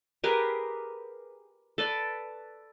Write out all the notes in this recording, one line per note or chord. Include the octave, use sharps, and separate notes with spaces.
G4 G#4 A#4 B4
A4 B4 D5